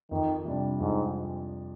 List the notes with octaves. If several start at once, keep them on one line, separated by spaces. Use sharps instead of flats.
F2 D#3
C3 G3 D4
F2 G#2